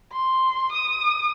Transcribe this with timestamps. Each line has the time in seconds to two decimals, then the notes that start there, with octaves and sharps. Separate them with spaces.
0.12 C6
0.72 D#6